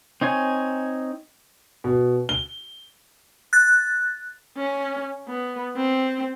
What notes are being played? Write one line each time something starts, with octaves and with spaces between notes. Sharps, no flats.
C4 D#4 C#5 G#5
B2
G7
F#6 A6
C#4
B3
C4